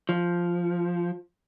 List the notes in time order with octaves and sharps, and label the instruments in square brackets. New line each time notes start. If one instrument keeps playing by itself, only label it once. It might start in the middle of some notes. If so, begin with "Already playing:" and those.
[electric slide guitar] F3